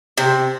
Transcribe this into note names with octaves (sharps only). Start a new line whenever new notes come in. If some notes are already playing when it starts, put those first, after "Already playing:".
C3